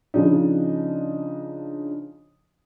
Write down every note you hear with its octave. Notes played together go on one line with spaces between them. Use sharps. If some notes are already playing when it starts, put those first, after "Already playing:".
C#3 F3 D4 D#4